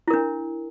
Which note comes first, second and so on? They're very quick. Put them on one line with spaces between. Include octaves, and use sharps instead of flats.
E4 A#4 D4